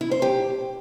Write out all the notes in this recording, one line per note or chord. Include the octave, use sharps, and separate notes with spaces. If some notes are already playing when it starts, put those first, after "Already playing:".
E4
C5
G4